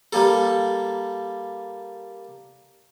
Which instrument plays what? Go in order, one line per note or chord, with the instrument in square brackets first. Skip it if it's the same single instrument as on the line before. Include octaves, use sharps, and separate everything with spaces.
[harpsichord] G3 A#3 A4